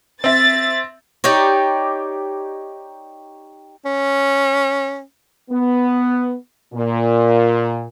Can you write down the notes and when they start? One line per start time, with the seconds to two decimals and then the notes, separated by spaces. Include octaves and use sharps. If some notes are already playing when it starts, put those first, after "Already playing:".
0.24 C4 E5 A6
1.24 D#4 G4 C#5 D5
3.85 C#4
5.51 B3
6.74 A#2